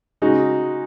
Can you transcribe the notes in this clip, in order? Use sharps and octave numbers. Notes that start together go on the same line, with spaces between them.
C#3 G#3 D#4 F#4